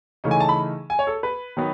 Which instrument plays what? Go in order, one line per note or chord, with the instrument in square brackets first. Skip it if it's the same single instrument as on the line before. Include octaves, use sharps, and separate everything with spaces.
[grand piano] C#3 E3 A3 D#4
G#5
A5
B5
G#5
C#5
A4
B4
D#3 F#3 B3